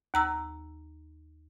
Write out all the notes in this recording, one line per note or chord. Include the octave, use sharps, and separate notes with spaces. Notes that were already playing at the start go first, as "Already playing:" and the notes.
D#2 A#5 E6